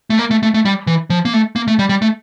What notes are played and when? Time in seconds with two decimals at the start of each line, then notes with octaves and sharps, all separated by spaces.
0.10 A3
0.19 A#3
0.31 A3
0.43 A3
0.54 A3
0.65 G3
0.87 E3
1.10 F3
1.25 A#3
1.33 A3
1.56 A#3
1.68 A3
1.79 G3
1.89 G3
2.02 A3